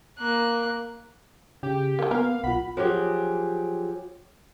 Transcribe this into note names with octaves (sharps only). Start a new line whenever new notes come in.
A#3 F#6
C#3 G4
F#3 A#3
A#3 B3 A#4 F5
B1 F4 F#5 B5
F3 F#3 G4 G#4